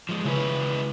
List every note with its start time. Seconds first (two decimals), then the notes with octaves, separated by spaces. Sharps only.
0.09 F3 G#3
0.24 C#3 G#3 E4 B4